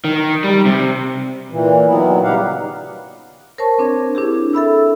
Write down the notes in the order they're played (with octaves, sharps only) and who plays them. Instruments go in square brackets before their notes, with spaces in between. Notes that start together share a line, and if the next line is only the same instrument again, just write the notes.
[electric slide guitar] D#3
G3
C3
[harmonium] A#2 E3
A#2 D#3 F#3 B3 E4
C#3 G3 D#4 G4 F5 F#5
[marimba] A#4 C5 C#5 A5 C#6
C4 D4 C#5 G#6
D4 E4 G4 G#4
A4 E5 B5 E6